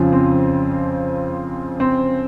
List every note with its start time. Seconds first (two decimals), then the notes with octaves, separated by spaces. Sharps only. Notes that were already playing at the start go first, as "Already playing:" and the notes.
Already playing: F2 C#3 F3
0.12 C4
1.80 C4